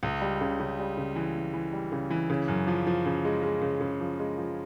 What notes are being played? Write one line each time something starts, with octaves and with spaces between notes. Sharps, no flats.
C#2
G3
C#3
C#3
G3
C#3
E3
E3
E3
G3
C#3
E3
C#3
F#2
F3
F3
C#3
G#3
G#3
C#3
C#3
F3
G#3
F3